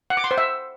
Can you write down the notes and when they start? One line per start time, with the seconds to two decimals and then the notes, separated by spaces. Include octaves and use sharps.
0.10 F#5
0.17 D6
0.24 C6
0.31 C5
0.38 E5